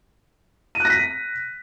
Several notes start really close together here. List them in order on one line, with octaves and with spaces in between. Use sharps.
D#7 F#6 A#6 B6